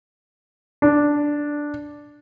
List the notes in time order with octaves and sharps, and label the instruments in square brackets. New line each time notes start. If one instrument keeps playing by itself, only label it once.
[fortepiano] D4